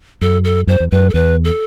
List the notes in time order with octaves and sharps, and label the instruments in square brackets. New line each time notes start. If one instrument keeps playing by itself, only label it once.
[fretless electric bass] F#2 [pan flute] A4
[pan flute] A4
[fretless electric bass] F#2 [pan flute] C5
[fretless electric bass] E2
[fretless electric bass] F#2 [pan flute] B4
[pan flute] A4
[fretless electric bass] E2 [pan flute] B4
[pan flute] A4